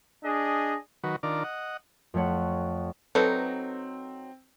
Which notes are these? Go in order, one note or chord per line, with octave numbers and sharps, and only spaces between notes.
D4 G#4 D#5
D#3 F#3 F#4 B4
D#3 D4 F4 A#4 D5
D#5 F#5
F2 A3 C#5 F#5
F#3 C4 D#4 A4 B4